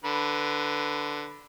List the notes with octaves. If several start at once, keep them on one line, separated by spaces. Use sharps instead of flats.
D3 B4